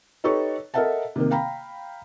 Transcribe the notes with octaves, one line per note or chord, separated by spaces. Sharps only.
D#4 G4 A4 B4 C#5 C#6
A4 A#4 D#5 E5 F#5 A5
C3 D#3 A#3
F5 G5 A#5 B5